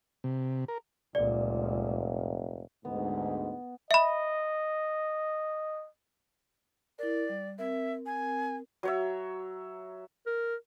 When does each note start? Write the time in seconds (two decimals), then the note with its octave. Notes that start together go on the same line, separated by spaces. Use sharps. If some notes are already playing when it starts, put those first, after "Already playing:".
0.24 C3
0.68 A#4
1.15 F1 C#2 A#2 D5
2.85 D2 G#2 B3
3.91 D#5 E5 B5
6.99 E4 A#4 D5
7.29 G3
7.59 C4 A#4 E5
8.06 G#5
8.83 F#3 C#5 E5
10.26 A#4